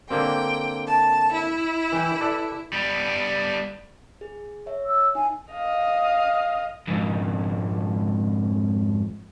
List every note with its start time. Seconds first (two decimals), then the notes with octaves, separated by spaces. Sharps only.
0.10 D3 A#3 C4 G5
0.87 A5
1.33 E4
1.92 E3 G5
2.21 A4 B4 D5
2.73 G3 B3
4.21 G#4
4.66 C#5 E5
4.86 E6
5.15 D#4 G#5
5.52 D#5 F5
6.88 F2 G#2